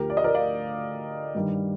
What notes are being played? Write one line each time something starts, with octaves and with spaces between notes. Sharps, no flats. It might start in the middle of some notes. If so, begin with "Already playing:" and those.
Already playing: D2 D3 F3 G4 A#4
D5
D#5
A#4 D5
D5 F5
G2 D#3 G3